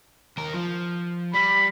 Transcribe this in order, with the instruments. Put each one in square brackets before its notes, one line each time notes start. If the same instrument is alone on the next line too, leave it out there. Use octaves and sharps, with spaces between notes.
[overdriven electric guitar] D#2 A#4
F3
[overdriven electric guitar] G3 [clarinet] B5